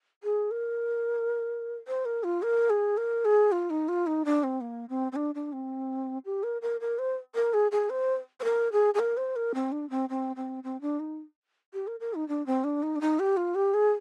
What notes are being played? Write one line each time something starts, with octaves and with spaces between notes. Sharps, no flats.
G#4
A#4
C5
A#4
F4
A#4
G#4
A#4
G#4
F4
D#4
F4
D#4
D4
C4
A#3
C4
C4
D4
D4
C4
G4
A#4
A#4
A#4
C5
A#4
G#4
G#4
C5
C5
A#4
G#4
G#4
A#4
C5
A#4
C4
D4
C4
C4
C4
C4
D4
D#4
G4
A#4
A#4
D#4
D4
C4
D4
D#4
D4
D#4
G4
F4
G4
G#4